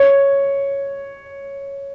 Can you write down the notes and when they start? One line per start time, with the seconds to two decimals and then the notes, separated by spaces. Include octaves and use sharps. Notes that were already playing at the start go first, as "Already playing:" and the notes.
Already playing: C#5